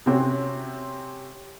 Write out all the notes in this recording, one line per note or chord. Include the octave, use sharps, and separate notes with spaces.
C3 C4 C#4 F#4